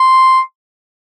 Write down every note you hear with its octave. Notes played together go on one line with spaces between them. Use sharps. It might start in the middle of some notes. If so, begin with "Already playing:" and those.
Already playing: C6